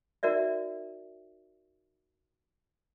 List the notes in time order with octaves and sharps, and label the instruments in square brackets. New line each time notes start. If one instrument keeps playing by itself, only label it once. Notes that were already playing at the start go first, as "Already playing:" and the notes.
[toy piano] D#4 F#4 A#4 D5 E5